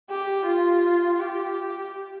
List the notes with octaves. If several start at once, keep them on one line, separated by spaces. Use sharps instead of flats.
G4
F4
G4